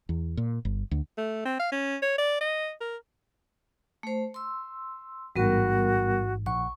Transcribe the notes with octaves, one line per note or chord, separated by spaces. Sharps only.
E2
A#2
G1
D2
A3
C4
F5
C#4
C#5
D5
D#5
A#4
A3 C5
C6 E6
A1 G#2 G3 B3 F#4 A#4
A#1 F#5 C#6